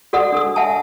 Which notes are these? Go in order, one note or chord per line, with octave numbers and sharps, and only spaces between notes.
F#4 A4 D5 F#5 C6 D#6
D4 A4 D#6
E5 F#5 G#5 A5